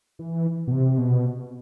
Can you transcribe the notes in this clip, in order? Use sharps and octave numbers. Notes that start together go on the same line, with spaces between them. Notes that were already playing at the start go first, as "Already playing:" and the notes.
E3
B2
C3
B2